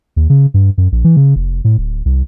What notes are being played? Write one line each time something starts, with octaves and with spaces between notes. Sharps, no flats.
D#2
C#3
G2
F#2
A#1
E3
C#3
F1
A2
D1
C2